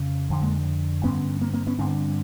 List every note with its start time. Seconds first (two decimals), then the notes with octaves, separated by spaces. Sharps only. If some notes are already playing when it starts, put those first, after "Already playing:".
Already playing: F2 C#3
0.30 F2 D3
0.42 G#3 A#3
1.04 G2 D3 B3 C#4
1.41 A#3 C4
1.54 A#3 C4
1.67 B3 C#4
1.78 G2 D3 C4 D4